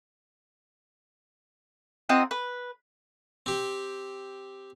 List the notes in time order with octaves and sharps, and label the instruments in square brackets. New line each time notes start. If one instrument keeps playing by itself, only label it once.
[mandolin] C4 D#4 F4 F#5
B4
[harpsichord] C4 G4